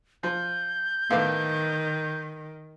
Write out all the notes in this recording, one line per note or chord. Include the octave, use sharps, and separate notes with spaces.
F3 G6
A2 D#3 B3 F5 D6